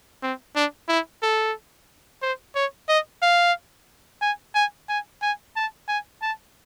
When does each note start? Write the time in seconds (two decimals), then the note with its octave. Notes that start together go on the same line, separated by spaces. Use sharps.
0.23 C4
0.56 D4
0.89 E4
1.23 A4
2.22 C5
2.55 C#5
2.89 D#5
3.22 F5
4.22 G#5
4.55 G#5
4.89 G#5
5.22 G#5
5.56 A5
5.88 G#5
6.22 A5